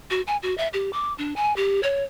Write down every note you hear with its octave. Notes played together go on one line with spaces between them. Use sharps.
F#4
G#5
F#4
E5
G4
D6
D4
G#5
G4
C#5